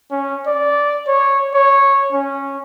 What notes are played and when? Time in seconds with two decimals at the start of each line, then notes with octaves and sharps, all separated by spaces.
0.11 C#4
0.46 D5
1.07 C#5
1.54 C#5
2.12 C#4